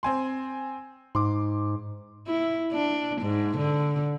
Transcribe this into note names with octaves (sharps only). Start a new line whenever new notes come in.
C4 G#5 C6
G#2 C6 D6
E4
D4
G#2
D3